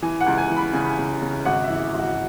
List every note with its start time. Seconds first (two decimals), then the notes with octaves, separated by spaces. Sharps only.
0.02 E3 G#5
0.21 F#5
0.26 C#2
0.38 G#5
0.50 E3
0.57 B5
0.73 C#3 G#5
0.83 B5
0.90 G#5
0.98 C#3
1.22 C#3
1.45 G#1 F#5
1.64 E5
1.70 E3
1.94 G#1
1.99 F#4